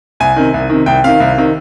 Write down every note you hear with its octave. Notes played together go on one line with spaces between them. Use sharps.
C2 G#5
C3 D#3
C2
C3 D#3
C2 G5
C3 D#3 F5
C2
C3 D#3